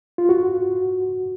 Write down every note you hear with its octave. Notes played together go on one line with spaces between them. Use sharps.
F4
F#4